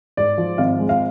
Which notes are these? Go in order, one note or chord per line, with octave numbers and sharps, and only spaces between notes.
G#2 D5
F3
G#1 F5
G#3
F5